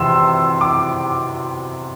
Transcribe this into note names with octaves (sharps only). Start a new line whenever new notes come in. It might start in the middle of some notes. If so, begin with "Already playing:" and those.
Already playing: E2 C3 C6 E6
D6